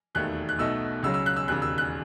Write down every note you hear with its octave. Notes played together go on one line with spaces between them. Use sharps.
E1 D#2 D#3 A3 F#6
F#6
B1 B2 A3 D#4 E6
C#2 C#3 F#3 E6
E6
F#6
E6
E1 D#2 C#3 F#6
E6
F#6